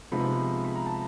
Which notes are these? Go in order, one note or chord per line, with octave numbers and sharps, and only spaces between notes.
C3 F3 G#3 B3 D#4 B5
B5
A#5
A5